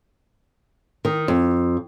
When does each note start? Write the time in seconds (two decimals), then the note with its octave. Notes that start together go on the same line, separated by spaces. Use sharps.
1.05 D#3
1.28 F2